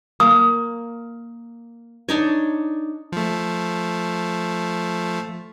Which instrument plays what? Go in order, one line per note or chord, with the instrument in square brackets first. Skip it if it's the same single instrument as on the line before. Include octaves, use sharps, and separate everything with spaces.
[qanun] A#3 [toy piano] D#6
[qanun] D4 D#4 C#5
[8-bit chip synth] F3 A3